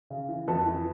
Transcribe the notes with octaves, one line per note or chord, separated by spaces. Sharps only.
C#3
E3
F2 A4 B4
E3